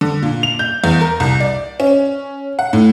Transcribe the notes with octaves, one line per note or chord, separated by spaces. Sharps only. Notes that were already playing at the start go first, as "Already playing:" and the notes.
D3
A#2
F7
G6
E2
A#4
C2
D5
C#4
F#5
A2